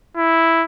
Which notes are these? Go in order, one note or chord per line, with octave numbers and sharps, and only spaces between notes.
E4